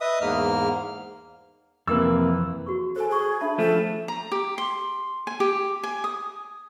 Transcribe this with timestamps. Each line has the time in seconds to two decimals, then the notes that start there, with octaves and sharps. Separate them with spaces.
0.01 B4 D#5 E5 D#6
0.21 E2 G#2 A#3 F6
1.87 F2 C3 E3 A#3 B4 E6
2.66 F#4 G#4 C#6
2.96 A4 C5 G#5
3.09 G#4 C5 C#6
3.41 D4 E5 A5 B5
3.58 F3 A3 C#4 G#4 A4 G5
4.08 A#5
4.32 G4
4.58 C6
5.27 G#5
5.40 G4
5.83 G#5
6.04 D#6